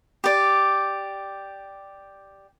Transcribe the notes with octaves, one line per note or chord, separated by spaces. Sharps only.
G4 D5